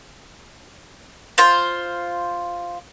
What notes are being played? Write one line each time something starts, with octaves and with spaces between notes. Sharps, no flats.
F4 C5